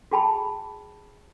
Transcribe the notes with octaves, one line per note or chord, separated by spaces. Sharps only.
F#4 G#4 G5 A5 B5